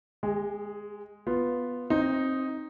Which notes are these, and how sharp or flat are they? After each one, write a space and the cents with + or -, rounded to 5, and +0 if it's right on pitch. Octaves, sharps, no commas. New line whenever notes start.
G#3 +0 G4 +45
B3 +0 F4 +0
C4 +20 D#4 +0